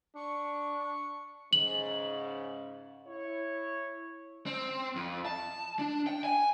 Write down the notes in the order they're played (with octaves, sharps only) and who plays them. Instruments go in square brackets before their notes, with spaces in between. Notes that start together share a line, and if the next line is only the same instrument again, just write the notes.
[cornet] D4 [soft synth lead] C#6
[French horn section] G#2 C#3 [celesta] F#7
[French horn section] E4 C#5
[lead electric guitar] C4
F2
A5
D4
G5
G#5